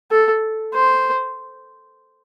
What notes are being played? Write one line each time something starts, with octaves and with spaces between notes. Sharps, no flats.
A4
C5